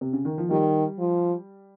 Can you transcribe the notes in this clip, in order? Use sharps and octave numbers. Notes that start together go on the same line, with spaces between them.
C3
C#3
D#3
F3
D#3 G3
F3